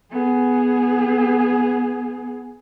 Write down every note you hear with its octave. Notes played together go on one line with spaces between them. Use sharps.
B3 G#4